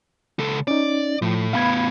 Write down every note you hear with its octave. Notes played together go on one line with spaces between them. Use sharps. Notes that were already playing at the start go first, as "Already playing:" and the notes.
C#2 A4
C#4 D#4 D5
A2 F3
A2 B3 F5 B5 G#6